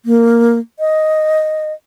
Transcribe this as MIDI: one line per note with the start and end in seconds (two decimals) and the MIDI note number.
0.05 0.59 58
0.79 1.72 75